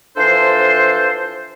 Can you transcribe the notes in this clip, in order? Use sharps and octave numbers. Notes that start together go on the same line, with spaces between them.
E3 F3 D4 A4 C5